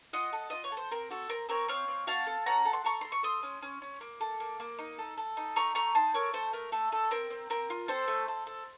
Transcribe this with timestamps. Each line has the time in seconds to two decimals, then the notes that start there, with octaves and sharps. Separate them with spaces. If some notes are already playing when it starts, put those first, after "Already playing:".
0.13 F4 D#5 F#5
0.33 A4
0.50 F4 D#5
0.64 C#5
0.72 A4
0.77 C5
0.91 C4 A#4
1.10 F#4 A4
1.30 C4 A#4
1.49 C4 A#4 C#5
1.68 C4 C#5 F5
1.88 C4
2.07 F#4 F5 A5
2.27 A4
2.46 C#4 F#5 A#5
2.65 A4
2.73 C6
2.84 A4 A#5 C#6
3.01 A4 C6
3.12 C#6
3.23 A4 C6 D#6
3.43 C#4
3.62 C#4
3.82 C#4
4.01 A#3
4.21 A4
4.40 A#3
4.60 A#3
4.79 D#4
4.98 A4
5.17 A4
5.37 D#4
5.56 A3 A#5 C#6
5.75 A3 A#5 C#6
5.95 D#4 A5 C6
6.14 A4 A#4 C#5
6.33 A3 A4 C5
6.53 A3 A#4
6.72 A3 A4
6.92 A3 A4
7.11 C4 A#4
7.30 C4
7.50 C4 A#4
7.70 F4
7.88 C4 A4 C5
8.08 A3
8.28 A4
8.47 A4